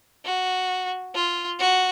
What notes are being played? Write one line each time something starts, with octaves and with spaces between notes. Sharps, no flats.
F#4
F4
F#4